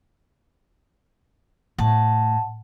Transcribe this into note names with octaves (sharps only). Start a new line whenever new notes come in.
A2 F#5 A5